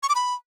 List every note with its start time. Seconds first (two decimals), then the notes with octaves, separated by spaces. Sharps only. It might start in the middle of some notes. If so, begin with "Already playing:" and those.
0.03 C#6
0.09 D6
0.15 B5